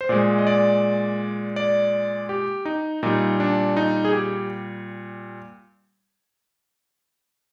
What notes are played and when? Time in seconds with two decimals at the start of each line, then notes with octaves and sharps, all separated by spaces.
0.01 C5
0.09 A#2 G#3 D5
0.38 D#5
0.47 D5
1.56 D5
2.29 G4
2.65 D#4
3.03 A#2 G3 D#4
3.40 D4
3.77 D#4
4.05 G#4
4.13 G4